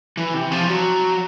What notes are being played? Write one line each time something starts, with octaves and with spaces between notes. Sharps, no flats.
E3
C3
F3
F#3